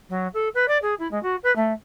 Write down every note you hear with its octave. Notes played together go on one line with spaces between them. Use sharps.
F#3
A4
B4
D5
G#4
E4
G#3
F#4
B4
A3